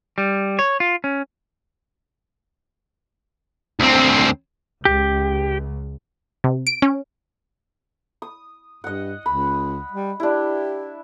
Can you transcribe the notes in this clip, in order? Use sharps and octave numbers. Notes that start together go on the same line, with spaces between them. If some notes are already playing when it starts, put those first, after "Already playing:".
G3
C#5
F4
C#4
D2 C4
C#2 G4
C3
D7
C#4
D#6
G2 D#5 F#5
C#2 B5
G3
D4 E4 G4